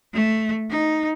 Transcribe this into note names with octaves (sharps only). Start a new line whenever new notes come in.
A3
D#4